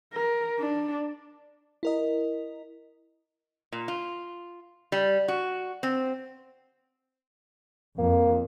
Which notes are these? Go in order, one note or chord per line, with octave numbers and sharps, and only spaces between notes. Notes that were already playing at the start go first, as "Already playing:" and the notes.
A#4
D4
E4 A#4 D#5
A#2
F4
G3
F#4
C4
F2 A#3